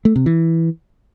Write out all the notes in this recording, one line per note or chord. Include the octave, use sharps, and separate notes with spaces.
A3
C3
E3